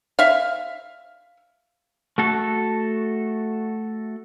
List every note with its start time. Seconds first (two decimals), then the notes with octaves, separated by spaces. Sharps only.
0.19 E5 F5
2.18 A3 F#4 A4